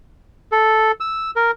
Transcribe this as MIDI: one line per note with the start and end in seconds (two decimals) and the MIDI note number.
0.52 0.92 69
1.00 1.31 88
1.36 1.51 70